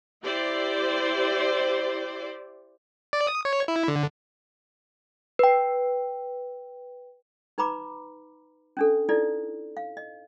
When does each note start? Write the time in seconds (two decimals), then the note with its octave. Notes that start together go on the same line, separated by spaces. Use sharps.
0.24 E4 G4 C5 D5
3.13 D5
3.27 D#6
3.45 C#5
3.68 E4
3.88 D3
5.39 B4 G5
7.58 D#4 B4 A#5 B5 D6
8.77 C#4 D4 A4
9.09 D#4 E4 A4 D5
9.77 F5
9.97 D#5